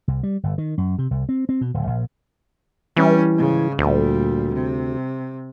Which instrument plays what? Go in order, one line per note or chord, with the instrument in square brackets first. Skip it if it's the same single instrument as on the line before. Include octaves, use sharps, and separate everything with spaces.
[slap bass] C2
G3
G1
D#3
F#2
C3
C2
C4
C4
B2
D1
A#1
[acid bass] E3 [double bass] G3 C#4
[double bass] G#2 C#3
[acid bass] D2 [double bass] A#2 G3
[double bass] C3